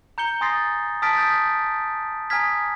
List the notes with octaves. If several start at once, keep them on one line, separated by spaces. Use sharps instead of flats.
A#5 G6 C#7 G7
G#5 C6 D#6 A6 A#6 C7
A5 D#6 F6 A6 B6 D7
D#6 F6 G6 B6 D7
G#5 A#5 D#6 F6 G#6 B6